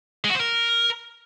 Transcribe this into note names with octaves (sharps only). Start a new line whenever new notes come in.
G#3
F#4
C5
A#4